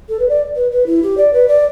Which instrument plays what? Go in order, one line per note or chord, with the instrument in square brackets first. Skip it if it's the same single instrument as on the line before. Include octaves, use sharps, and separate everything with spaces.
[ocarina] A4
B4
D5
B4
B4
E4
G4
D5
B4
D5